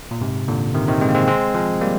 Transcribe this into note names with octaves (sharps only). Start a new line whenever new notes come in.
A#2
G#2 C3
A#2 D3
C3 D#3
C3 D#3
G#3 C4
A#3
G#3 C4
G#3 C4
F3 G#3
G3 A#3